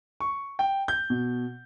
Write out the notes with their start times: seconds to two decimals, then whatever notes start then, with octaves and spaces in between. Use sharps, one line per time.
0.20 C#6
0.59 G5
0.88 G6
1.10 B2